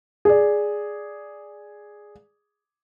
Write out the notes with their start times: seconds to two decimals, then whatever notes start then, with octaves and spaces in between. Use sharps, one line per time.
0.25 G#4 D5